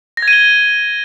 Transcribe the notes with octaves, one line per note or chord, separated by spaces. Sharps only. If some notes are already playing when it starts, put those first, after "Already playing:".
A#6
G#6
D#7
G7